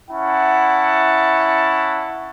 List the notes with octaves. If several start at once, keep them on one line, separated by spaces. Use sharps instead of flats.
C#4 E4 F#5 A5